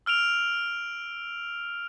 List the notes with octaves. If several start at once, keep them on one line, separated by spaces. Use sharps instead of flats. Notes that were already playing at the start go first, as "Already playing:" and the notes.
E6 F6 D7 F7